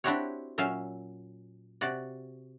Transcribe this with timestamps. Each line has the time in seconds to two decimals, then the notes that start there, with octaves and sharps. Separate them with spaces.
0.04 C4 D4 E4 F#4 G4 C#5
0.58 A#2 F#3 C#4 E5 F5
1.81 C3 F#4 D5